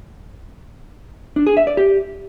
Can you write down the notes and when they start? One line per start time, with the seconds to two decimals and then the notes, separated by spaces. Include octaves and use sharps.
1.36 D4
1.46 G#4
1.57 E5
1.67 D5
1.77 G4